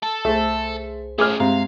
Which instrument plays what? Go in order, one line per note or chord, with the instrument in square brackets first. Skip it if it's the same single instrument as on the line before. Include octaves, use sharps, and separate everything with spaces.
[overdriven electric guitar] A4
[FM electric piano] C2 G#4 C5 [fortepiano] A3
[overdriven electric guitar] A3 C#4 [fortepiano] G#4 D6 F6
[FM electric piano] G2 G#3 A#5 [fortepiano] C3 [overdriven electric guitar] F5